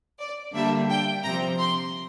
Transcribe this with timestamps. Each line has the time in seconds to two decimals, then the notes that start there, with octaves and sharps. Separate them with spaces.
0.19 D5
0.54 D3 G3 A#3 D4 E5
0.89 G5
1.23 C3 F3 C4 A#5
1.58 C6